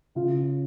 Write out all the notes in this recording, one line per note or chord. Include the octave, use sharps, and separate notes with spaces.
C#3 F4